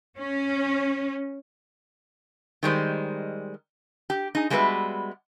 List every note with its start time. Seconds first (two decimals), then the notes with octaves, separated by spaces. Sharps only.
0.18 C#4
2.63 D#3 G3 G#3 C5
4.10 G4
4.35 D#4 G#4
4.50 G3 G#3 B3 F#4 B4 E5